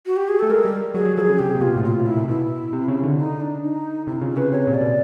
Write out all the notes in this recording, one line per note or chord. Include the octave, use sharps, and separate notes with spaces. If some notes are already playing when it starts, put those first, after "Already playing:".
F#4
G4
G#4
A3 A4
G#3 A#4
G3
F#3 G#4
F#3
F3 G#4 A4
C#3
C3 G4
A#2
B2 F4
A2
A#2 F4
A2
A#2 E4
C3
B2 E4
C3
C#3
D3
D#4
D4
D#4
C3 E4
C#3 F4
C#3 B4
C3 C#5
A#2
D5
B2